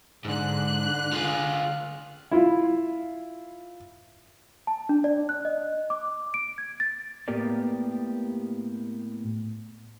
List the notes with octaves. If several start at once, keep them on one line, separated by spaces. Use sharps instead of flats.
G#2 D3 F#6
F4 G#4
E4 F4
A5
D4
D5
F#6
D#5
D6
D7
G#6
A6
A2 A#3 B3 G4 A#4 D5